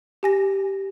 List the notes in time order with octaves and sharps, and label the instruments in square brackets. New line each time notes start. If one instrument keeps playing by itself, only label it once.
[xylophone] G4 G#5 A#6